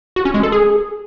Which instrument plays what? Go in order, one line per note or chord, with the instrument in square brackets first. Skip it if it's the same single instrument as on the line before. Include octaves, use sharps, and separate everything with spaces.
[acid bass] F#4
C#4
G#3
A4
G#4